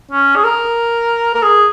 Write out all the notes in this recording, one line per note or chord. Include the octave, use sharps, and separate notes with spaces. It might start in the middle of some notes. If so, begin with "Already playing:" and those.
C#4
G#4
A#4
A#4
G#4